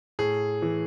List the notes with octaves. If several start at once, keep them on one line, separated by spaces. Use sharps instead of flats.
A2 G#4
E3